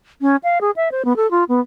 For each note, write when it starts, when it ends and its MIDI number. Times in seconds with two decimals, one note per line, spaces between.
0.21 0.36 61
0.44 0.58 77
0.61 0.71 68
0.76 0.89 76
0.92 1.03 72
1.05 1.16 59
1.16 1.29 69
1.31 1.44 65
1.49 1.60 59